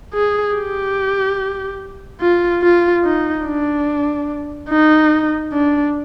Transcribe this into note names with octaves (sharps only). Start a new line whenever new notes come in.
G#4
G4
F4
F4
D#4
D4
D#4
D4